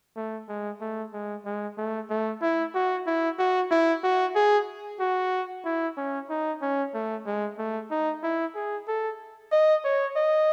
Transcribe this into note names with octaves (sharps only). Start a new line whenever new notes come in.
A3
G#3
A3
G#3
G#3
A3
A3
E4
F#4
E4
F#4
E4
F#4
G#4
F#4
E4
C#4
D#4
C#4
A3
G#3
A3
D#4
E4
G#4
A4
D#5
C#5
D#5